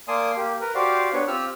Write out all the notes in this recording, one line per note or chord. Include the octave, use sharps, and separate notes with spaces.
A#3 D5 G#5 A5 C6 D#6
A#3 G4
A#4 B4
F#4 G4 C5 D5 F5
B3 D4 B4 C#5
C4 F4 G4 E6 F6